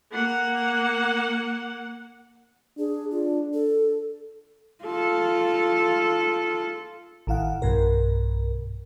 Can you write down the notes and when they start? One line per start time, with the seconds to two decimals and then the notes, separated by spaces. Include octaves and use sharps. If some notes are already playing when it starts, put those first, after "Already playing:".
0.11 A#3 F#5
2.79 D4 G#4
3.11 F4
3.53 A4
4.85 F4 A4
7.27 A1 D#3 E4 F5 F#5
7.62 B1 G2 B2 A#4